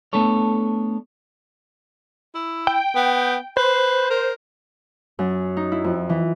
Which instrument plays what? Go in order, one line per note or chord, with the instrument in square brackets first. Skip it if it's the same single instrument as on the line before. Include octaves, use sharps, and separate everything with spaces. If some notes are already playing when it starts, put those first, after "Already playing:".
[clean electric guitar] A3 B3 D4 A4 C#5
[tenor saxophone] E4
[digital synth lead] G5
[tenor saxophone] B3
[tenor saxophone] B4 [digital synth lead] C5
[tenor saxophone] A#4
[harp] F#2
D#4
E4
F2
E3